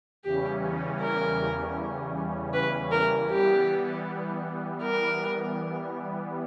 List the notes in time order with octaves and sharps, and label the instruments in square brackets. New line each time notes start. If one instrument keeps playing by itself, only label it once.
[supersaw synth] E2 C#3 E3 G3 C#4 [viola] G4
[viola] A#4
B4
A#4
[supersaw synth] E3 G3 B3 [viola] G4
[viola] A#4